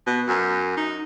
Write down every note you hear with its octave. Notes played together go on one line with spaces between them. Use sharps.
B2
F#2
D#4